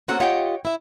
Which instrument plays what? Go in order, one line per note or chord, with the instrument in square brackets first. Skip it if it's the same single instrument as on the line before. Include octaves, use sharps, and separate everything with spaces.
[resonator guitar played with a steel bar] A#3 F#4 A4 [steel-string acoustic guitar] C4 C#4 F#5
[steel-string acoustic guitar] F4 G4 D#5 [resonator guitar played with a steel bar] C#5 F#5 G5
[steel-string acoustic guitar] E4 E5